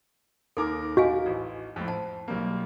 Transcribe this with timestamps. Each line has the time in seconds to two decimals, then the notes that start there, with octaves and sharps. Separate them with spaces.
0.57 D#2 D#4 A4 A#4 D6
0.97 F#4 D#5 F5 G#5
1.26 A1
1.76 F2 A2
1.88 C5 A5
2.28 B1 G3 A#3